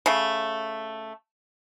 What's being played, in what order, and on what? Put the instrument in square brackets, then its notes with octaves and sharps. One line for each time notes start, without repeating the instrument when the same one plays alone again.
[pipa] C#3 A3